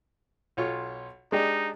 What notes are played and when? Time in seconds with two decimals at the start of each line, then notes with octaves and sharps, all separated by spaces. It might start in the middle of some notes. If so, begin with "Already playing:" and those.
0.57 B1 F4 C#5
1.32 G#3 D4 D#4 G4